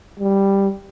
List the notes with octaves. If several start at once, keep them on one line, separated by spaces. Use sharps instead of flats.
G3